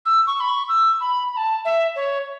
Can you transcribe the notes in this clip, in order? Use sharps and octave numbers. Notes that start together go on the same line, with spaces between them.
E6
C#6
B5
C#6
E6
B5
B5
A5
E5
C#5